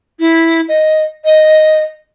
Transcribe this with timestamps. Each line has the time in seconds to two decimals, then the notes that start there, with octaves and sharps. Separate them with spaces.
0.19 E4
0.68 D#5
1.24 D#5